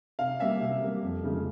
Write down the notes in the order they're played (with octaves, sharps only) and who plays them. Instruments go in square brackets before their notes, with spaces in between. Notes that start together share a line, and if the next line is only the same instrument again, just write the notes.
[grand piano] C3 F5
G3 A#3 C#4 E5
C3
G3 A#3
F2
C#3 F3 G#3